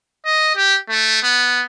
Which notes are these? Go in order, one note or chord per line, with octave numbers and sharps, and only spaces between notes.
D#5
G4
A3
B3